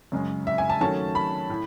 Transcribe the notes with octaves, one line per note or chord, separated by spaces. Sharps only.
F#2 C#3 G#3
E5
G#5
A5
D#3 F#3 A3 C#4 A5
B5
A2